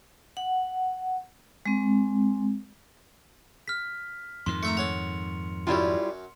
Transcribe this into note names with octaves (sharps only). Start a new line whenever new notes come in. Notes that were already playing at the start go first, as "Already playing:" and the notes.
F#5
G#3 C4
F6 B6
F2 G#2 D#3 C6
A3 E5 A#5 C#7
A4 C#5 F#5 F7
F#2 F#3 G3 E4 F4